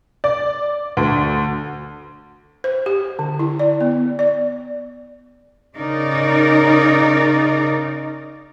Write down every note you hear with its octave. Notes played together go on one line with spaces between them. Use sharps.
D5
D2
C5
G4
D3
E4
D5
B3
D5
C#3 D#4 A#4 D5